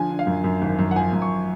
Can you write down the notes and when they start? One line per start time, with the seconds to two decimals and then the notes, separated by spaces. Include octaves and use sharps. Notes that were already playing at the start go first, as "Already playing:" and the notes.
Already playing: D3 F3 G#5
0.10 D3
0.19 F5
0.27 F#2
0.44 F#2
0.62 G#1
0.79 F#2
0.91 F#5
0.96 F3 G#5
1.13 F#2
1.22 C#6